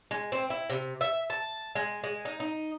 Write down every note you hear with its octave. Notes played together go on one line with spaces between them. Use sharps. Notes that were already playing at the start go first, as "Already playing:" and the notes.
G#3
C4
E4
C3
E5
A5
G#3
G#3
D#4
D#4